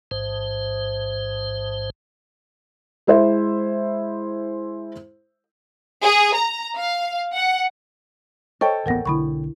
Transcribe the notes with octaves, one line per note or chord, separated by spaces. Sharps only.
A1 G#2 C5
G#3 E4 C5 E5
G#4
A#5
F5
F#5
A4 C5 C#5 D#5 G5 C#6
D1 A1 B3 A#4 F#5 A#6
B1 D3 E4 B5 C#6